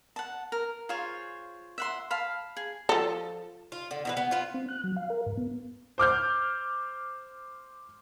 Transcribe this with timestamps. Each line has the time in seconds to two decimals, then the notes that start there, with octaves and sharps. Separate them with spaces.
0.16 F#5 A5
0.52 A#4
0.89 F4 G#4 C5 C#5
1.78 E5 F#5 C6
2.10 F5 A5 B5
2.57 G#4
2.89 F3 A4
3.72 F4
3.91 D3
4.05 B2 E3 B4
4.17 B3
4.31 B3 F4
4.54 C4
4.69 F#6
4.84 F#3
4.96 F5
5.10 A#4
5.26 G#2
5.37 B3
5.98 C5 D6 F6 G6